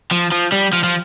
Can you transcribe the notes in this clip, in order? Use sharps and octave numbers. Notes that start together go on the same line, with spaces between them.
F3
F3
G3
F3
F3